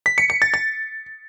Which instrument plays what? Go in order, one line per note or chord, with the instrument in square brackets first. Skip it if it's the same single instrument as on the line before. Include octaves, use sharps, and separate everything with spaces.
[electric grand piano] B6
C#7
C#7
A6
A6